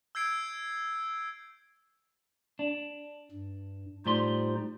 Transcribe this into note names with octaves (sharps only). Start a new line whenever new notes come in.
E6 G6 G#6 C7 D7
D4
G2
A2 G3 D#4 F4 C5 C6